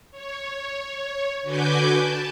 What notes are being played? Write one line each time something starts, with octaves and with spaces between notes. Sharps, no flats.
C#5
D3 F#4 B4 G#5 D6 G6
A5